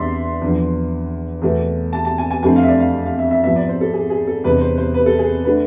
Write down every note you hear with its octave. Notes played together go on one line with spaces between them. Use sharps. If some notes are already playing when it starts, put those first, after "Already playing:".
Already playing: E2 D3 G#3 D5 E5 C6
E2 D3 F3
E2 B2 A3
A5
A5
G#5
G#5
F2 D3 A3 C4 G#5
F5
E5
D5
F5
F5
E5
E5
G#2 F3 B3 E5
D5
C5
A4
G#4
G#4
A4
E2 C3 G#3 D4 B4
C5
C5
B4
A4
G#4
D3 A3 D4 B4